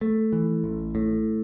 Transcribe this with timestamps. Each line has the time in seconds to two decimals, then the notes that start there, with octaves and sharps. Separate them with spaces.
0.01 A3
0.33 E3
0.64 A1
0.95 A2